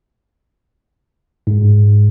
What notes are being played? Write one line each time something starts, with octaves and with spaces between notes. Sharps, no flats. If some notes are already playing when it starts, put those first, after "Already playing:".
G#2